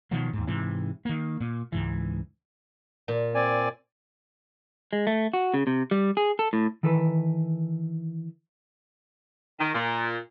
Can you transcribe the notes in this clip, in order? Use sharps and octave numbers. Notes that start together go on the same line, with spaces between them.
B2 D#3 F3 F#3
D#2 G#2
G#2 C3 E3
D#3 A#3
A#2
C#2 G#2 E3
A#2
C4 D5 G#5
G#3
A3
F#4
C#3
C3
G3
G#4
A4
A2
D#3 E3 A4 B4
D#3
A#2